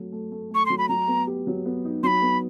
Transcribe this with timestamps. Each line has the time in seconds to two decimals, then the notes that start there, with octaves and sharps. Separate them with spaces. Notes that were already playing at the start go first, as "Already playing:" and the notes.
Already playing: F#3 A3
0.12 A3
0.32 A3
0.50 A3 C#6
0.66 F#3 C6
0.78 B5
0.89 F#3 A#5
1.08 B3
1.27 G4
1.47 F#3
1.66 B3
1.85 D#4
2.03 F#3 C6
2.07 B5
2.22 B3